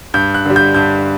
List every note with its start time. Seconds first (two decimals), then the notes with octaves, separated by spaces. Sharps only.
0.14 G2 G6
0.34 F#6
0.45 D3 G3
0.56 G6
0.74 G2 G6